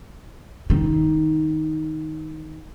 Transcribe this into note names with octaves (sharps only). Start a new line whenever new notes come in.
D#3 D#4